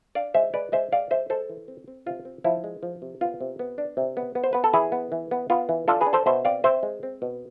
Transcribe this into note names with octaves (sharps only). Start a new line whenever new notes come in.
D4 D5 F5
G#3 C5 E5
G#3 B4 D5
G#3 C5 E5
G#3 D5 F5
G#3 C5 E5
G#3 A4 C5
E3
C4
C4
C3 F4
C4
F3 E4
G#3
F3
C3
B3 F4
C3
B3
D4
C3
B3
B3
C5
B3 B4
A4
E3 E4 G#4
B3
E3
B3
B3 F4
E3
D4 F4 A4
G#4 B4
D4
A4 C5
B2 C5 E5
C4 D5 F5
C4 C5 E5
G#3
C4
B2